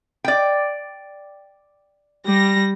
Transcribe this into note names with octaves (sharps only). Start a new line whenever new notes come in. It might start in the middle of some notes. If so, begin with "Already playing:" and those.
D5 G5
G3 A#6